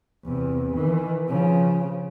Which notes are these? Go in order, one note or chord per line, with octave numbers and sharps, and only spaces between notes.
E2 C3
D#3 E3
C#3 F3